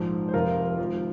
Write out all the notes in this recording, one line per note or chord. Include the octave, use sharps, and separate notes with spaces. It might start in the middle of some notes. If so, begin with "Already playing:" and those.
Already playing: A#1 G#2 F3
C5
F1 F2 C3 F3 F4 A#4
G#1 G#2 F3